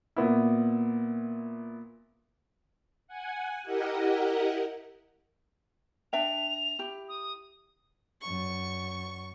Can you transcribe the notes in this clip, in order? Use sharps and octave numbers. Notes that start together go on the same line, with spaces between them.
A#2 B3 E4
F#5 G#5
E4 G4 A#4 D#5 F#5
D4 E5 G5 F7
E4 G4
D#6
F#2 C#6